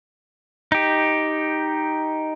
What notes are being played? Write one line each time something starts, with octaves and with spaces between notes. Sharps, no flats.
D#4 G4